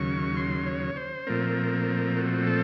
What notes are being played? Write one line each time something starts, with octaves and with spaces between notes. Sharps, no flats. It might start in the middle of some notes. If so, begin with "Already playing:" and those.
Already playing: D#2 C#3 F#3 C#6
C6
C#5
C5
A#2 F3 A3 C4 A#4
F#4
A4